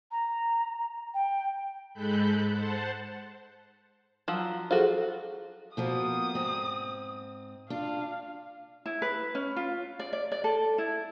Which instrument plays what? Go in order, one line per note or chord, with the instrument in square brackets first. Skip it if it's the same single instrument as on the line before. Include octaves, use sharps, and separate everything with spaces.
[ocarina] A#5
G5
[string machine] G#2 G#3 A4 B5 F#6 G6
C5 F#5 A5
[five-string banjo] F3 F#3
[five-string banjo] F4 F#4 [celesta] G#4 A4 C5
[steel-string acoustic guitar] B2 F3 A#3 [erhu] D#6
[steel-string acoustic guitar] G#2 C4
[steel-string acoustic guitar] D4 F4 [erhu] F5
[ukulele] E4
B4
C#4
F4
D5
D5
D5
A4
E4